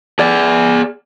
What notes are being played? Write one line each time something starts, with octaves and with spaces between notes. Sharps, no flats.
G#4 D5